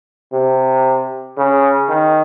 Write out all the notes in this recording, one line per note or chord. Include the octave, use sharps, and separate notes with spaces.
C3
C#3
D#3